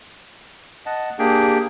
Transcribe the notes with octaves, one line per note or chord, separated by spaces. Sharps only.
D#5 F#5 A5
A#3 D4 G4 G#4 G5